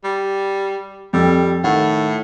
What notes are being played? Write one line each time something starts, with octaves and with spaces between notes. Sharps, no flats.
G3
F2 G3 E6
A2 D#3 F#5